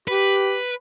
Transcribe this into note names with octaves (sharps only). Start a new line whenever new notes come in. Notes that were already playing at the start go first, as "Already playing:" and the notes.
G4 B4